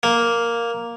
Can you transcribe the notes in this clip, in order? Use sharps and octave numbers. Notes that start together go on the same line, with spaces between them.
A#3